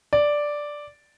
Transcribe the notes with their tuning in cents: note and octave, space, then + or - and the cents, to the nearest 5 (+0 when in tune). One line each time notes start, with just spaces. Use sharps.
D5 +0